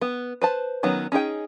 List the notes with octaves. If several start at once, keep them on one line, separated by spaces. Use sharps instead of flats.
B3
B4 C5 A5
D#3 F#3 B3 C#4
C#4 D#4 G#4 G5